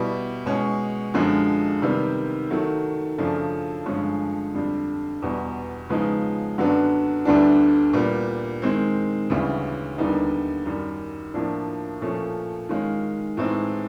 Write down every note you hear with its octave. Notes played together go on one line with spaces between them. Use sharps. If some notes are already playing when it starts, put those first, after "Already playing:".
Already playing: B2 G3 B3 E4
B2 G#3 C#4
F#2 D3 F3 G#3
C3 D#3 G3 B3
D#3 F#3 A3
F#2 C#3 F3 A3 D4
G2 D3 F3 G#3 C#4
F2 D3 G3
E2 B2 G3
C#3 F3 G#3 B3 D#4
F#2 D3 F#3 B3 D4
D2 D3 G3 B3 D4
A#2 G3 B3
D#3 G#3 C4
D2 C#3 E3 G3
D#2 D3 G3 B3 D#4
F#2 D#3 G3
A2 F3 A#3 D4
A#2 F3 A3 C#4
D#3 G#3 C#4 F4
A2 E3 G#3 C4 D#4